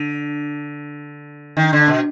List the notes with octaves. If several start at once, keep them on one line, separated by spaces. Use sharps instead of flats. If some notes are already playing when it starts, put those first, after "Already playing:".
Already playing: D3
D#3
D3
B2